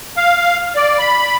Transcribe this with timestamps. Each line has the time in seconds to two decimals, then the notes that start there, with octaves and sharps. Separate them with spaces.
0.17 F5
0.76 D5
0.99 B5